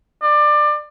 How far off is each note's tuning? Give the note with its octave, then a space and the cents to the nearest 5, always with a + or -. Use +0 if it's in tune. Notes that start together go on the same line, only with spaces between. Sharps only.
D5 +25